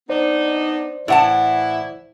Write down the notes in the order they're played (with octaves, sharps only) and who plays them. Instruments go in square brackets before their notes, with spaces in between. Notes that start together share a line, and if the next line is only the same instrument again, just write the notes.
[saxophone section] B3 D4 D#4 [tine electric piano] C5 D5
[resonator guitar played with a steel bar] A2 F#5 A5 [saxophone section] E3 E4